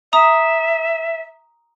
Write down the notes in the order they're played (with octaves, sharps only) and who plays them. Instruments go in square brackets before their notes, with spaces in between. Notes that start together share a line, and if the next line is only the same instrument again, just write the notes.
[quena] E5 [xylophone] A#5 D#6